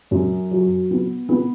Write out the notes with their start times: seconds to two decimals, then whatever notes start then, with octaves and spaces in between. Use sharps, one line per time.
0.11 F#2
0.51 F#3
0.91 B3
1.29 B3